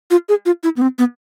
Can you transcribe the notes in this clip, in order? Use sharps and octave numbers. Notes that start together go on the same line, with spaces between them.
F4
G#4
F4
E4
B3
C4
B3